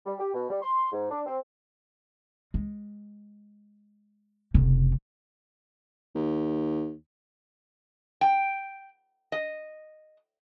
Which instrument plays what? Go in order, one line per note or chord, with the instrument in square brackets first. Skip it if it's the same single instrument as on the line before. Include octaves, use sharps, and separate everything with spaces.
[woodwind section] G3
G4
B2
G3
C6
G#2
D4
C4
[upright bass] G#3
F1 C#3
[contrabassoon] D#2
[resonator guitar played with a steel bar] G5
D#5